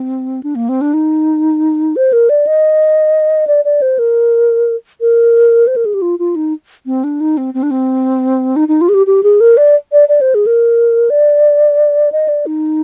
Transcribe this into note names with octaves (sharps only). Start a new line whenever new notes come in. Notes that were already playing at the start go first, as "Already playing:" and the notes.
Already playing: C4
D4
A#3
C4
D4
D#4
C5
A#4
D5
D#5
D5
D5
C5
A#4
A#4
C5
A#4
G#4
G4
F4
F4
D#4
C4
D4
D#4
C4
C4
D4
C4
D#4
D#4
F4
G#4
G4
G4
G#4
A#4
D5
D5
D5
C5
G#4
A#4
D5
D#5
D5
D#4